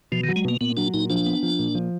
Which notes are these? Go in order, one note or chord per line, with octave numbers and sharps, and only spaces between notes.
B2 F3
D#3
F#3
G#3
B2 A#3
A#2 B3
F#3 D4
A#2 D#4
F3 D4
B3
F3
A#2
F3